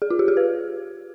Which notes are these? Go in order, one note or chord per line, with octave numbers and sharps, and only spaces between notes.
G#4
F4
G4
G#4
B4